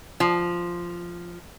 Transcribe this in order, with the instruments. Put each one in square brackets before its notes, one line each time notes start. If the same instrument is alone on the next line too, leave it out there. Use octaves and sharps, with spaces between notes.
[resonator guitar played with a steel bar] F3